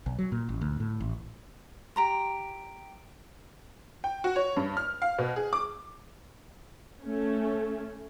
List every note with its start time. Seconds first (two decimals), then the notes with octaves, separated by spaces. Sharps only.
0.06 B1
0.19 F#3
0.32 A#2
0.49 A1
0.61 D2
0.80 A2
1.01 A1
1.96 G4 A#5 C6
4.04 G5
4.24 F#4
4.36 C#5
4.56 G2
4.77 F6
5.02 F5
5.19 B2
5.36 G#4
5.53 D6
7.02 A3 C#4